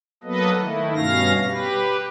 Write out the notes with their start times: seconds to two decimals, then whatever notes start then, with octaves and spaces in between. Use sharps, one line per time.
0.24 F#3 A#3 B3 A4 B4 D#5
0.59 D#3 A3 E4
0.95 G2 B2 C#4 F5 A#6
1.46 G4 B4